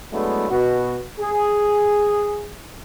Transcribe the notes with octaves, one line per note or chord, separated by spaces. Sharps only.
F#3 G#3 A3 B3 D4 E4
B2 F#4
G#4